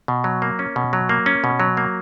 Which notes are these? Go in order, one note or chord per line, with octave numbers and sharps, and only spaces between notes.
B2
F#3
A#3
C#4
B2
F#3
A#3
C#4
B2
F#3
A#3